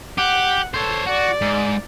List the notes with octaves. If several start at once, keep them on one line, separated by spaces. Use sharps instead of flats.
G4 F#5
A4 C5 C#5
F#4 D5
G#2